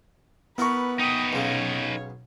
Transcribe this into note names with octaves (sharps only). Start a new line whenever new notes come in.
B3 E4 A#4 B4 A#5 C#6
D#4 B4 G5 D#6
B1 C#3 C#5